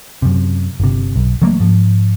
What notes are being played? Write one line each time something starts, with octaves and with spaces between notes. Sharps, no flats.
F#2 C3
G1 C3
B1
E3 F#3 A3 A#3
G#2 F3